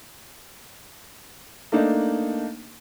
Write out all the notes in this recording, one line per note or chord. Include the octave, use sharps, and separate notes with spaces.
A3 A#3 D4 D#4